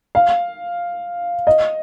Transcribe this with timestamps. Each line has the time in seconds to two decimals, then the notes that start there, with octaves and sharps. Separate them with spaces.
0.15 F5
1.47 D#5